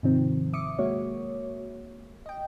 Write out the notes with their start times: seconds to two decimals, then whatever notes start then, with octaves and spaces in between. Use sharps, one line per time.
0.03 G#2 C3 D#3 F3 C4
0.53 E5 D6 D#6 C#7
0.79 G#3 A#3 F#4 C#5
2.26 D#5 G5